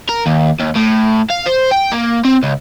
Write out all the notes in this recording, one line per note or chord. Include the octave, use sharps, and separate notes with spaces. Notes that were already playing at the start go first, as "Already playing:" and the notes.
A#4
D#2
D#2
A2
F5
C5
G5
A#3
C4
C#2